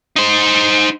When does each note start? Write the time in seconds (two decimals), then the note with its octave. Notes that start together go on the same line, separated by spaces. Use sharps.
0.16 D#4 C5